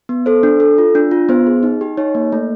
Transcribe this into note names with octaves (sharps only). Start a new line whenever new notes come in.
B3
A4 C5
D4
A4
F4
D4
F4
B3 C5
G#4
D#4
G4
D#4 C#5
A#3
A3